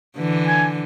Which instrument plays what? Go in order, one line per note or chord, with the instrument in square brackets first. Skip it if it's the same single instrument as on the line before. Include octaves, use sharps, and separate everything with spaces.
[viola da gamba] D3 E3
[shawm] G#5